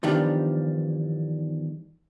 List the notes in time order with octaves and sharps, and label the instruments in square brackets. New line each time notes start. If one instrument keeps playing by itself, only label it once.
[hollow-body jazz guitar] E2 G2 D#3 F3 G3 D4